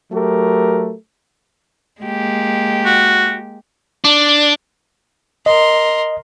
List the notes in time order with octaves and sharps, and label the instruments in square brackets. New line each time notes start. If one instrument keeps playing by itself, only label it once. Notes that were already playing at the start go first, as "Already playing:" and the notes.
[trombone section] F#3 A3 G4 A#4
[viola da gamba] G#3 A#3 G4
[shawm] F#4
[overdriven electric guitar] D4
[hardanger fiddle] A#4 C6 [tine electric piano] D#5